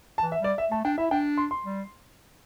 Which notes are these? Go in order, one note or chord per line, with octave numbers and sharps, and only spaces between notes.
A5
E3
E5
G3 D5
E5
A3 A5
D4 G5
E4 E5
D4 G5
C6
C6
G3